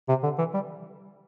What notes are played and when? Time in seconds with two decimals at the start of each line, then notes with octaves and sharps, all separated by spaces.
0.08 C3
0.23 D3
0.38 E3
0.54 G3